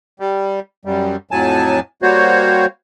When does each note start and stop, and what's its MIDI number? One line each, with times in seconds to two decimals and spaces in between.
0.20 0.60 55
0.85 1.16 42
0.85 1.16 55
1.31 1.80 41
1.31 1.80 45
1.31 1.80 54
1.31 1.80 80
1.31 1.80 81
2.02 2.66 55
2.02 2.66 58
2.02 2.66 66
2.02 2.66 72
2.02 2.66 73